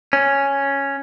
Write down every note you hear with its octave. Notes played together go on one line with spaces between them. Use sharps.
C#4